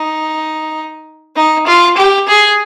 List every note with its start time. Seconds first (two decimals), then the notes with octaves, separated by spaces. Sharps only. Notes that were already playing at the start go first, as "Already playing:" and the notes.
Already playing: D#4
1.36 D#4
1.67 F4
1.97 G4
2.28 G#4